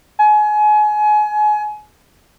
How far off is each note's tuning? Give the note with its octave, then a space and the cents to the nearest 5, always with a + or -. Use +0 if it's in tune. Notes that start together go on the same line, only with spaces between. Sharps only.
G#5 +30